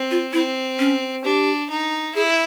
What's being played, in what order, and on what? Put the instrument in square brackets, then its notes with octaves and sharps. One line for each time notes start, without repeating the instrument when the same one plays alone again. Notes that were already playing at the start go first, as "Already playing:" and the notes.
Already playing: [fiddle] C4
[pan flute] F4
[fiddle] C4 [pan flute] E4
[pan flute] C#4
[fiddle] D4 [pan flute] G4
[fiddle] D#4
[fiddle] E4 [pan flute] G#4